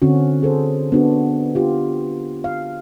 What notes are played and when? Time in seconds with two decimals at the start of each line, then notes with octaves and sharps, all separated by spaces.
0.02 D3 C4 C#4 F#4
0.42 G#4 A4 C5
0.92 B3 D4 F#4
1.55 F4 G4
2.44 F5